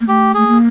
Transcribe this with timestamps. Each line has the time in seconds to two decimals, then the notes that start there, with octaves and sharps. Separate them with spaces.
0.01 A#3
0.08 A3 G4
0.34 A3 G#4
0.47 A#3